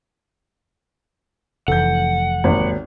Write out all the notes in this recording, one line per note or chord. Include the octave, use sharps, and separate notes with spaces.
F1 E3 A4 F#5 G6
G#1 D#2